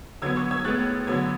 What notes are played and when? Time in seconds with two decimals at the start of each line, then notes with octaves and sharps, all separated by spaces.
0.22 D3 F#3 B3 E6 G#6
0.36 C#6 E6
0.51 E6 G#6
0.64 A2 G#3 B3 F#6 A6
1.07 D3 F#3 B3 E6 G#6